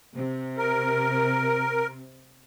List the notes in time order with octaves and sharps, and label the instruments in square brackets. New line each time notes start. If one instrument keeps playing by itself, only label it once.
[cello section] C3
[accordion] A#4